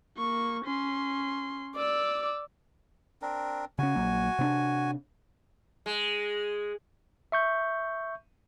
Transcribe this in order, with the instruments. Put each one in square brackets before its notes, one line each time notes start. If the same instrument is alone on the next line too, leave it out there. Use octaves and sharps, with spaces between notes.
[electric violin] A#3 C#6
C#4 C6
[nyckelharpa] D5 [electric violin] D6 E6
[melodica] C4 D4 A#4
[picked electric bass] C#3 C#4 [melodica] F#4 G#5
[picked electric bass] A#1 F#3 A#3
C3 C4 D4
[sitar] G#3
[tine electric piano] E5 C#6 G6